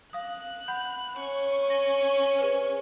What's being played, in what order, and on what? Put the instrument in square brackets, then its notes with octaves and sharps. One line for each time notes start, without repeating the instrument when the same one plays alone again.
[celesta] F5 D#6 [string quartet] F#6
[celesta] F#5 B5 G6
[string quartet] C#4 C#6
[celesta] A#6
G#4 B4 C5